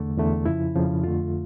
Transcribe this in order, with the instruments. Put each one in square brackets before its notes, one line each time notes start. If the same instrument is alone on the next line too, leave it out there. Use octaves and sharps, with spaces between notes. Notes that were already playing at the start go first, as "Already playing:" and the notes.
Already playing: [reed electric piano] E2 D3 A3
E2 D3 A3
F2 C#3 F3 E4
F2 C#3 F3
F2 D3 A3 F4